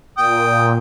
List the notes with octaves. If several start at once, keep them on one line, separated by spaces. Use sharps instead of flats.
A#2 G5 D#6